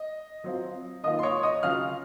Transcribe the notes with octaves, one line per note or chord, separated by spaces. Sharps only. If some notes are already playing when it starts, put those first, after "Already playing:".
Already playing: D#5
F#3 C4 F4
D#3 A#3 F4 D#5 D#6
C6
C#5 C#6
D#5 D#6
C#3 F#3 C#4 F4 F5 F6